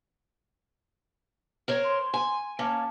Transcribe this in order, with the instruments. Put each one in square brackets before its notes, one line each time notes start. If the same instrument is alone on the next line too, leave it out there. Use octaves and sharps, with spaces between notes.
[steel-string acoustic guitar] A#4 C5 C#5
[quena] C6
[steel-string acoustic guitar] G#5
[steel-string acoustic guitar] A#3 C#4 [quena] A5